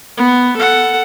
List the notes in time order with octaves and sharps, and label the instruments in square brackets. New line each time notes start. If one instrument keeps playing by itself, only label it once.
[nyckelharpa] B3
A4 F#5